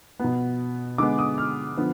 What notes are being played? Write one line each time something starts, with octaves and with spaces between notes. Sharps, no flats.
B2 B3
D3 G#3 B3 D6
D#6
F6
D3 F3 B3